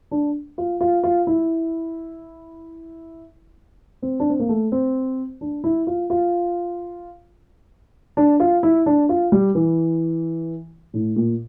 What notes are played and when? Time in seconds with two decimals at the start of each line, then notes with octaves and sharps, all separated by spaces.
0.11 D4
0.58 F4
0.81 F4
1.03 F4
1.27 E4
4.02 C4
4.20 D4
4.29 C4
4.39 A#3
4.49 A3
4.72 C4
5.41 D4
5.64 E4
5.87 F4
6.10 F4
8.17 D4
8.40 F4
8.63 E4
8.86 D4
9.09 F4
9.32 G3
9.55 E3
10.94 A2
11.16 A#2